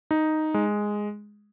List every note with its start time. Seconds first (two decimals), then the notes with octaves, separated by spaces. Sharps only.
0.11 D#4
0.54 G#3